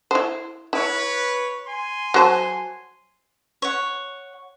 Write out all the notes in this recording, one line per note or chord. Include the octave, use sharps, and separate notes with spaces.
E4 C5
E4 B4 C#5
G#5 C6
F#3 C5 A5
C#5 F#5